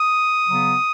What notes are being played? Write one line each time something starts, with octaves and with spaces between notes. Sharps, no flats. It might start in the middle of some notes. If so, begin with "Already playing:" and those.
Already playing: D#6
C#3 F#3 B3